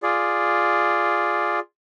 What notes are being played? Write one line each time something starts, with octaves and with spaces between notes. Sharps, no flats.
F4 G#4 D5